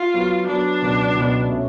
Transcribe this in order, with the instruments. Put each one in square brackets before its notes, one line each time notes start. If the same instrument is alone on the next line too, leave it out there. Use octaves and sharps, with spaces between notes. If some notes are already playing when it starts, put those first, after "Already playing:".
Already playing: [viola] F4
[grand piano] F#3 B3 F#4
[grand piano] F#3 B3 F#4 [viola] D4
[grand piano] C#2 B2 F#3 B3
C#2 B2 F#3 B3
B2 A3 C#4